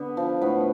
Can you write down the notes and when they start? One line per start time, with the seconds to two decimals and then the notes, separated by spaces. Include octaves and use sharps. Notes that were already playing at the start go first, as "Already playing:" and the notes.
Already playing: D3 B3
0.17 F3
0.41 A2 B3